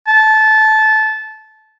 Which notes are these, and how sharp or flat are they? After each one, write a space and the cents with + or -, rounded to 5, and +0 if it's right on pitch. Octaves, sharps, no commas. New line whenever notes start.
A5 -20